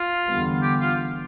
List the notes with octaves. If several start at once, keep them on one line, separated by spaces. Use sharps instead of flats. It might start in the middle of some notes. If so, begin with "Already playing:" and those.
Already playing: F4
E2 D3 G3 B3
G4
F4